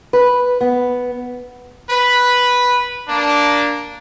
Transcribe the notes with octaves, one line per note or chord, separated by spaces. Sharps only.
B4
B3
B4
A#3 D4